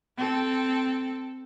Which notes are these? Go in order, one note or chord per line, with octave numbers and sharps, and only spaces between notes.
C4 A4